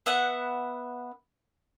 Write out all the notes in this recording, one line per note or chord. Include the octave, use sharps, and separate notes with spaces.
B3 E5 F#5 F#6